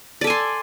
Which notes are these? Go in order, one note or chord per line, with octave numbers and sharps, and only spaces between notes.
A4 D5 G#5 C6